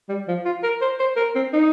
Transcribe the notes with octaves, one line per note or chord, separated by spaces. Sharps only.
G3
F3
F4
A#4
C5
C5
A#4
C4
D#4